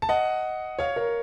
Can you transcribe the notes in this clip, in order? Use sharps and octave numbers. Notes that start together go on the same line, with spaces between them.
A5
D#5 F#5
C#5 F5
A#4 C#5